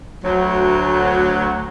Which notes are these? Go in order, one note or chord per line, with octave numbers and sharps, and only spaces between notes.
D2 F#3